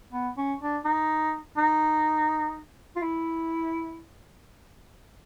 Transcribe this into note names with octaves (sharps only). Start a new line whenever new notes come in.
B3
C#4
D4
D#4
D#4
F4
E4